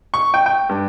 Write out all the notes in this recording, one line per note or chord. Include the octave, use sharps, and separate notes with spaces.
C#6
G5
G5
G2